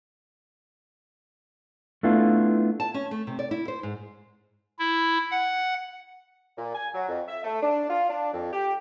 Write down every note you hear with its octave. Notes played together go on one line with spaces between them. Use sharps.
A3 B3 D4 E4 F4
A5
C#4
A3
C3
D5
E4
C5
G#2
E4
F#5
A#2
G#5
F#3
F2
E5
A3
D4
F4
D4
F2
G4